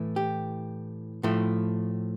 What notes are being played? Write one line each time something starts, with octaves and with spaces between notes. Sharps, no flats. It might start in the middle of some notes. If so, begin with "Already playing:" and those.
Already playing: A2 E3 A3
G4
A2 F3 A3 E4